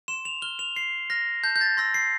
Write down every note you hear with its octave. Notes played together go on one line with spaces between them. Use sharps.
C6 E7
F7
F6 G7
F7
C6 C7
F6 A#6
A5 G6
G6
A6
C6 E6 G6 A#6
C7